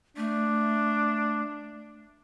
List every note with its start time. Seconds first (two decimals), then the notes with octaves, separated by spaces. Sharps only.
0.17 A3 D4